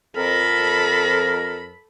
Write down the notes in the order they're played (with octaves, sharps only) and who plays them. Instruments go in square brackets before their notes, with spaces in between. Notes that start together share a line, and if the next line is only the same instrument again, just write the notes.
[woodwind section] F2 A#4 [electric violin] A4 B5